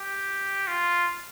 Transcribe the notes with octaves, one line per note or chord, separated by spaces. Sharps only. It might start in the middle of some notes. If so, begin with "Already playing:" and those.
Already playing: G4
F4